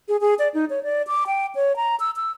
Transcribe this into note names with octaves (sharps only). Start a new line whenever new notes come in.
G#4
G#4
D5
D#4
C#5
D5
D6
G5
C#5
A#5
E6
E6